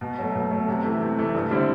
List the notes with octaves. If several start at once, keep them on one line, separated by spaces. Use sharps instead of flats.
B2
F#3 A3
B2
F#3 A3
C3
E3 A3
C3
E3 A3
G2
D3 G3 C4 E4